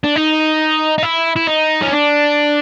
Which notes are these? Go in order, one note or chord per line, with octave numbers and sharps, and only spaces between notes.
D4
D#4
D#4
E4
E4
D#4
C#4
D4